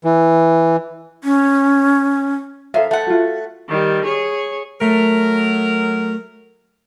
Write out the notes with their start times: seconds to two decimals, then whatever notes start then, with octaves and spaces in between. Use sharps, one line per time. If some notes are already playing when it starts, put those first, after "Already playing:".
0.04 E3
1.24 C#4
2.74 F#2 A4 C5 E5 F5
2.91 A3 F#5
3.07 F4 F#4
3.69 D#3 G3
4.04 G#4 C#5
4.81 F#3 A3 A#4